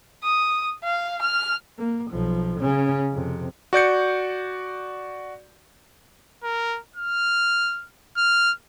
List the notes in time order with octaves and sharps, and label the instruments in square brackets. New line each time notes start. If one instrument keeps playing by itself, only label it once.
[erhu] D#6
F5
F6
[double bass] A#3
B1 F3
C#3 C#4
F2 C3
[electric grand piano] F#4 D5 G6 C#7
[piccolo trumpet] A#4
F6
F6